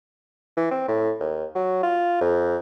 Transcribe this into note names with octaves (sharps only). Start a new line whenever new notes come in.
E3
C4
A2
D#2
F#3
F4
F2